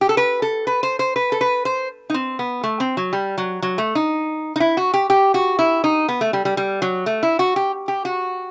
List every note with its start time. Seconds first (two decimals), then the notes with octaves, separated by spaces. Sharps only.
0.01 G4
0.09 A4
0.17 B4
0.42 A4
0.67 B4
0.83 C5
0.99 C5
1.16 B4
1.32 A4
1.41 B4
1.65 C5
2.10 D#4
2.14 C4
2.39 B3
2.63 A3
2.80 C4
2.97 F#3
3.13 G3
3.38 F#3
3.62 F#3
3.78 A3
3.95 D#4
4.56 D#4
4.60 E4
4.77 F#4
4.94 G4
5.10 G4
5.34 F#4
5.59 E4
5.84 D#4
6.09 B3
6.21 A3
6.33 G3
6.45 G3
6.57 G3
6.82 F#3
7.06 A3
7.23 E4
7.39 F#4
7.56 G4
7.88 G4
8.05 F#4